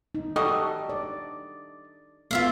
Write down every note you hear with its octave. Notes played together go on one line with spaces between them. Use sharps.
D#4
G3 F#4 A4 D#5
D5
A3 B3 F4 E5 F5